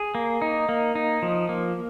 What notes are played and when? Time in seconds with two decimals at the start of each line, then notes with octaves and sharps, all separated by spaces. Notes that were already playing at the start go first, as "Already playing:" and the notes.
Already playing: G#4
0.15 A#3
0.42 D#4
0.69 A#3
0.95 D#4
1.22 F3
1.49 A#3